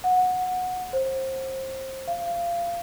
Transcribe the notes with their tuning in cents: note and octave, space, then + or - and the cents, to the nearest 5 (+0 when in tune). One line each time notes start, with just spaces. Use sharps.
F#5 -15
C5 +25
F5 -20